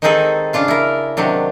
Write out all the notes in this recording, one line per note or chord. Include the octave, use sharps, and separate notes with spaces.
D#3 G#3 C4 D#4 G#4 A4
C#3 D4 F4 F5
E4 A#4
C3 D#3 F#3 D4